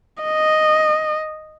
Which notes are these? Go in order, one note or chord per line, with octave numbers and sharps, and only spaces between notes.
D#5